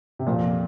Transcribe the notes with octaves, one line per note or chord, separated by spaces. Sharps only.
C3
F2 A#2